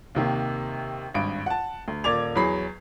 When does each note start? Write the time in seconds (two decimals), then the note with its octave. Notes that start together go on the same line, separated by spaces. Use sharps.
0.15 D#2 C3 D#3 A#3
1.14 G#1 G2 D7
1.46 F#5 A5
1.88 D2
2.04 D#1 A#3 D5 D6 G#6 F7
2.35 E2 F#3 G#4 B5 C7